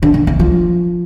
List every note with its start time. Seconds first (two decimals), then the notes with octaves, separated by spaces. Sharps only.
0.03 D3
0.14 D#3
0.27 E3
0.40 F3